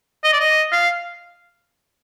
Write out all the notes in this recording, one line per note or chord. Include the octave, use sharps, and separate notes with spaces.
D#5
D5
D#5
F5